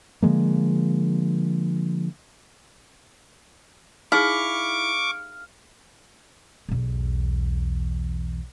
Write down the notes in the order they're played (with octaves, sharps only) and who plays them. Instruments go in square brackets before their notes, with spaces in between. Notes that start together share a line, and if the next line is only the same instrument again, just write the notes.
[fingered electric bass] D3 F3 G#3 A#3
[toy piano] D#4 G#4 [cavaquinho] E4 [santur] F5 [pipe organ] C#6 D6
[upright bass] B1 E2